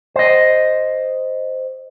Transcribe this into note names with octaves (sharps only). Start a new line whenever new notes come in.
C5 D#5